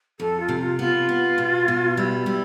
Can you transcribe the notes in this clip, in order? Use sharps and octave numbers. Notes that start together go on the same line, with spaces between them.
F2 A4
F4
C3
F4
B3 F4
B3
B2
B2
G3 E4
G3